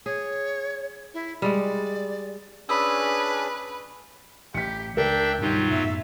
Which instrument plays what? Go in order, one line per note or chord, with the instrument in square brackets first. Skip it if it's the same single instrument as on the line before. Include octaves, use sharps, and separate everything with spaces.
[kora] G#4 [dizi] C#5
[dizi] E4
[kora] G3 G#3 [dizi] D5
[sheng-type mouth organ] C#4 D4 G#4 [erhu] B4 [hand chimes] B5 D#6 E6
[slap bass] A1 [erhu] G4 [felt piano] B6 C#7
[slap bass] C#2 [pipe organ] D4 E5 [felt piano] A#4 [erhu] G5
[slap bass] G2 B2 D#3 [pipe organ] F#3 F4 [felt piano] D#4 [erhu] G4
[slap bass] F#2 A2 B3 [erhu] E5